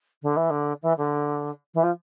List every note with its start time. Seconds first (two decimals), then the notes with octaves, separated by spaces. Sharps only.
0.23 D3
0.37 E3
0.50 D3
0.82 E3
0.98 D3
1.74 E3
1.83 F3